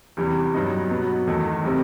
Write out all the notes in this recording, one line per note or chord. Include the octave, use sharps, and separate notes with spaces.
E2 C3 E3 G3
G2 F#3 B3 D#4
B2 F#3 B3
E2 D#3 A3 D#4
C3 D#3 G3 C4